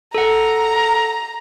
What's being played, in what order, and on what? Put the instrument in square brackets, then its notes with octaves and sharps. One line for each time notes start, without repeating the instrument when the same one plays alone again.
[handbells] A4 F#5 [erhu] A#5